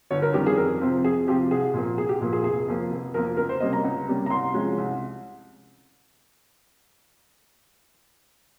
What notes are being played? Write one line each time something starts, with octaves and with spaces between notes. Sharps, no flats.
G1 C#5
A#4
F2 D#3 G3 C#4 G4
G#4
F2 A#4
C3 F3 C4
F2 G#4
C3 F3 C4 G4
C2 G#4
A#2 F3 A#3
C2 G#4
G4
A#2 F3 A#3
G#4
F1 G#4
F2 C3 F3 A#3
F1
F2 C3 F3 A#3 A#4
C#2 A#4
C5
C3 G3 A#3 C#4 D#5
A#5
C#2
C3 G3 A#3 C#4
A#5
C2 C6
C3 F3 G#3 C#4
C2